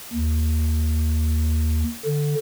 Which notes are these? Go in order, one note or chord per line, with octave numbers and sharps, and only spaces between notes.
D#2
D3